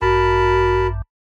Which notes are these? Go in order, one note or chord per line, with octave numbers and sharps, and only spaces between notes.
A1 G2 F#4 A#4 A5 B5